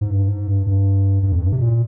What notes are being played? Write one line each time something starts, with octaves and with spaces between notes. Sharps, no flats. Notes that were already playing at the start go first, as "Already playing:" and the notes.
G#2
G2
G#2
G2
G2
G2
F2
G2
C3
A#2